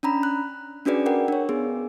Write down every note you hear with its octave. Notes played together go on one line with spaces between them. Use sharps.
C#4 D4 A#5 B5
F#6
C#4 D4 F#4 G#4 B4 D5
A#4 F#5 G5
D4 C#5
B3 G#4